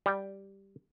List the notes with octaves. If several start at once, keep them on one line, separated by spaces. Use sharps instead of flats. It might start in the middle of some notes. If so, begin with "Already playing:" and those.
G3 G5